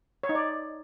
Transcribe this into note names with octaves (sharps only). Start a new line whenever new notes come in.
C#5
D#4
D5